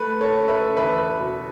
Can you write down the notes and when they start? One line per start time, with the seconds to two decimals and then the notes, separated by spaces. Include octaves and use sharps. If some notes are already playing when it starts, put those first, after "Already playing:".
Already playing: A3 B4
0.21 A4 C#5
0.35 C#4
0.48 B4 E5
0.76 E2 B4 E5
0.98 B4
1.19 B2